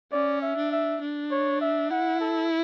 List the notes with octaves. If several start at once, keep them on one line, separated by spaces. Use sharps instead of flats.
C#4 D5
E5
D4
E5
D4
C#5
E5
E4 F#5
A4